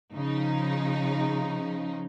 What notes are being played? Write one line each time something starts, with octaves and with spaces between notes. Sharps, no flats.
C#3 F3 D#4